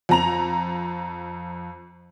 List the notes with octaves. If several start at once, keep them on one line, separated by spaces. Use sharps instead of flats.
F2 A#5 F7